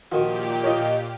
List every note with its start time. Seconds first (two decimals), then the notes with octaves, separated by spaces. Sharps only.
0.12 A#2 D#3 F3 F#4 G4
0.63 F4 A#4 C#5 D#5 F5